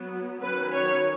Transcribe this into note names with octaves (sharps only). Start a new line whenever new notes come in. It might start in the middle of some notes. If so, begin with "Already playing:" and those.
Already playing: F#3 B3
D#3 F#3 C#4 B4
C#5